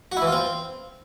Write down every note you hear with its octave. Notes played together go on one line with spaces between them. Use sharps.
F#4
E4
E3
F4
C4